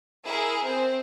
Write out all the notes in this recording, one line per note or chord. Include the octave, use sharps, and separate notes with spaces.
E4 G#4 A#4
C4 C5